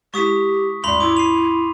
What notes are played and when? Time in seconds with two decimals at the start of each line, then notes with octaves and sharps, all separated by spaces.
0.14 G#3 E4 G4 C#6 D#6 B6
0.84 D#2 G#2 G#3 D5 B5 C6 F7
1.00 E4 B5 C6 D6 E6
1.17 C7 D#7 F7